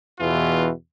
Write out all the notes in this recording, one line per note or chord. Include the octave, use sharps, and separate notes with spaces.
E2 B2 E3 F4